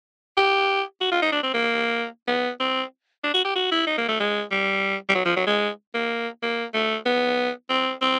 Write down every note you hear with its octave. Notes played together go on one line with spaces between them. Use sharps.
G4
F#4
F4
D#4
D4
C4
A#3
B3
C4
D4
F#4
G4
F#4
E4
D#4
A#3
A3
G#3
G3
G3
F#3
F3
F#3
G#3
A#3
A#3
A3
B3
C4
C4